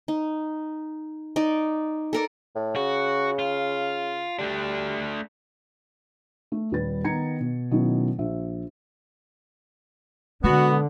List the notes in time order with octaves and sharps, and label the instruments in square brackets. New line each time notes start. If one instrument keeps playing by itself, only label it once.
[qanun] D#4
D#4 D5
A4 A#4 D5
[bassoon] A2
[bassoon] C#3 [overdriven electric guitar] F#4
[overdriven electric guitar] F4
[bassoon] G3 [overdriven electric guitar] A3 D4
[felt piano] A3
D#1 G3 B4 A6
D#3 B3 A#5 G#6 C#7
B2
B2 D#3 F#3 C#4 D#4 E4
A#1 E5
[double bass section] D3 [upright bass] G#3 [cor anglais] B3 [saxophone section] F#4